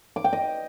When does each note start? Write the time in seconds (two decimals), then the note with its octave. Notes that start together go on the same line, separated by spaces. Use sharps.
0.16 D6
0.24 G5
0.33 D#5